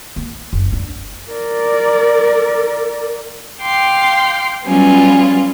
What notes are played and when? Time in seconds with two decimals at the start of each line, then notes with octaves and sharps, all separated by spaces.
0.16 A#3
0.53 F#1
0.72 D4
1.32 A#4 D5
3.62 F5 G5 C6 D6
4.66 F#3 G3 B3 C#4 F4